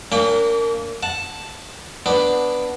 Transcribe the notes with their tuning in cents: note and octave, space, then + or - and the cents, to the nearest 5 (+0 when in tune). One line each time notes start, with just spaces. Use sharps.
A#3 -15 D4 -45 G5 +35
F#5 -10 A5 +0
B3 +0 D4 +0